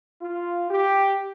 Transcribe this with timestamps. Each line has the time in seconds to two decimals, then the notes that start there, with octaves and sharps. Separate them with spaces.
0.22 F4
0.70 G4